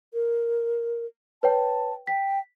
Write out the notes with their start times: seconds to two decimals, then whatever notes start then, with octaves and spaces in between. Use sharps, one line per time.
0.14 A#4
1.43 B4 C#5 G5 A5
2.07 G5 B6